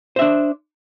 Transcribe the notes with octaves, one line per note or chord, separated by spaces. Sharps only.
D4 C5 E5